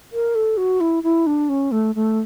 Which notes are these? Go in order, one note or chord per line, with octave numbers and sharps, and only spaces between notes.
A#4
A4
F#4
E4
E4
D4
C#4
A3
A3